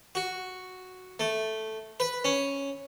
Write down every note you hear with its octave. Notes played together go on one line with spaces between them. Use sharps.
F#4
A3
B4
C#4